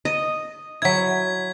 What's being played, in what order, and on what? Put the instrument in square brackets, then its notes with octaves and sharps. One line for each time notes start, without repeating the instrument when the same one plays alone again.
[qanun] D#5
[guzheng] F#3 E4 [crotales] G#6 B6